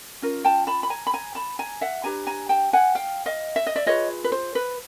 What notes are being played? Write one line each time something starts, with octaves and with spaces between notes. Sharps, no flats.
C#4 F4 A#4
G5 A5
A5 B5
B5
G#5 A#5
B5
G#5 A#5
A5 B5
G#5 A#5
E5 F#5
D4 G4 B4 G#5 A#5
G#5 A#5
G5 A5
F#5 G#5
F5 G5
D#5 F5
E5
D#5
D5 E5
F4 G#4 B4 C#5 D#5
B4
C5
B4